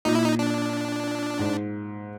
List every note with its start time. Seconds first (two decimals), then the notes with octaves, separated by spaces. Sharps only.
0.05 A#2 D#4
0.15 E4
0.25 D#4
0.39 D4
1.39 G#2